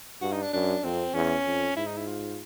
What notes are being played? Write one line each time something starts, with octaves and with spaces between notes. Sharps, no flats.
G2 F#4
D#4
D4
F#2 D4
F2 C4
E2 C#4
F2
G#2 E4
D#4
E4
F4